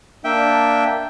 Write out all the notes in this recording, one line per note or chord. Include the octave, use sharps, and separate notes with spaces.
A#3 D4 E5 G5